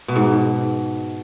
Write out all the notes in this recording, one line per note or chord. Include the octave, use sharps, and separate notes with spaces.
B2
G#2